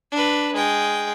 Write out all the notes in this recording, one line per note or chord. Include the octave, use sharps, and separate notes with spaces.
D4 B4
G#3 G5